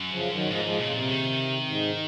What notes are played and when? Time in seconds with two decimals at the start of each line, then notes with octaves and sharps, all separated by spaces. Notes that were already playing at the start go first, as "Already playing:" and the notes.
Already playing: F#2
0.12 C#3 F3
0.31 D#3 F#3
0.50 G#2 F3 G#3
0.64 F3 G#3
0.80 A#2 C#3
0.93 C3
1.08 D#3
1.66 G#2